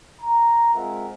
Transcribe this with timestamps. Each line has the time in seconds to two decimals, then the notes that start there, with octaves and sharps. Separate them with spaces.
0.22 A#5
0.74 G#3 C4 F4 A#4 E5 F#5